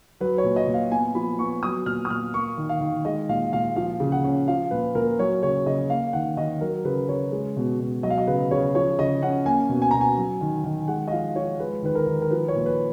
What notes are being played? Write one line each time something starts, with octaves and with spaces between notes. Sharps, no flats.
F#3 B4
C#5
A#2
D#5
A#2
F5
B3 G#5
F3 B5
B3 C#6
F#3 D#6
A#2 F6
D#6
A#2 F6
A#3 C#6
D#3
F5
D#3
G#3 D#5
A#2 F5
A#2 F5
F3 F5
C#3
F#5
C#4
F3 F5
A#2 B4
A#2 A#4
F#3 C#5
C#3 C#5
C#3 D#5
A#3 F5
D#3 F#5
D#3 D#5
F#3 A#4
C#3 B4
C#3 C#5
G#3
B2
B2
F#3 D#5
F5
D#5
C#3 B4
C#3 C#5
F3 C#5
C#3 D#5
C#4 F#5
A#3 G#5
B2
G#5
B2 A#5
G#5
F#3
D#3
D#3
G#3 F#5
D#5
F3 F5
F3 C#5
G#3 B4
D#3 B4
A#4
D#3
A#4
F3 B4
C#5
A#2
B4